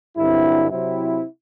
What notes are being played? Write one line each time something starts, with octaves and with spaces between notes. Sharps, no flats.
G2 D3 F#3 C4 E4
C3 F#3 C4 E4